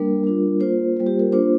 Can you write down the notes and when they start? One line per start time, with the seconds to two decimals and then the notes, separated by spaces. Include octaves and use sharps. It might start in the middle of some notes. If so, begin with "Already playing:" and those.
Already playing: G3 A#3 D4 A#4
0.24 G3 D4 F4
0.60 A#3 F4 C5
0.97 G3 A#3 F4
1.07 G4
1.20 A#4
1.32 A#3 D4 F4 C5